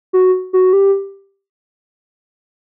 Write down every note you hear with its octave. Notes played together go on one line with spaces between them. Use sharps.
F#4
F#4
G4